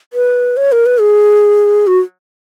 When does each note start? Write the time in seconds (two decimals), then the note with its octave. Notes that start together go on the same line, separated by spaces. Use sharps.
0.13 B4
0.57 C#5
0.72 A#4
0.86 B4
1.00 G#4
1.87 F#4